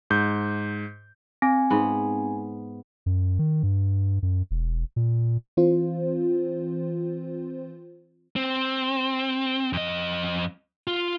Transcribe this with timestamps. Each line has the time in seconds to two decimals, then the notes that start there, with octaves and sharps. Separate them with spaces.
0.10 G#2 G6
1.42 C4 G#5
1.70 G#2 B3
3.06 F#2
3.39 D#3
3.63 G2
4.22 F#2
4.51 E1
4.96 A#2
5.57 E3 C4 F4 C5
8.36 C4
9.73 F2 D#5
10.87 F4